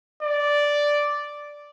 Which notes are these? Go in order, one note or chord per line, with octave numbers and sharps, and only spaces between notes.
D5